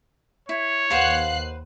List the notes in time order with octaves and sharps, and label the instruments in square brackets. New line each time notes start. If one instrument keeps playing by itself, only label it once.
[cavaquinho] E4 [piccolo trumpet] C#5
[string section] D#2 F#6 C7 [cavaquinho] B4 C5 F#5 [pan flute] F5